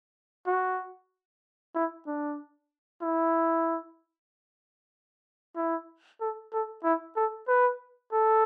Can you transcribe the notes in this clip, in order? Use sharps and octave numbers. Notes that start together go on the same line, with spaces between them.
F#4
E4
D4
E4
E4
A4
A4
E4
A4
B4
A4